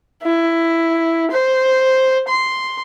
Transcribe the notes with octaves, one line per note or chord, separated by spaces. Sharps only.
E4
C5
C6